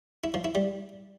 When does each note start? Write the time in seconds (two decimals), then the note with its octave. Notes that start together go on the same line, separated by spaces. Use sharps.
0.24 E4
0.34 F3
0.44 E4
0.55 G3